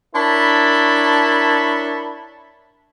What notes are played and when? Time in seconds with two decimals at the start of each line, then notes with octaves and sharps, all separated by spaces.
0.15 D4 E4 A#4 C#5 A5 B5